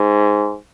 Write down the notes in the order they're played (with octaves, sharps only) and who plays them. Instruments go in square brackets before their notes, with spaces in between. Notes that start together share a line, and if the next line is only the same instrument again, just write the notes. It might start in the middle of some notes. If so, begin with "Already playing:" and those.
Already playing: [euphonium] G#2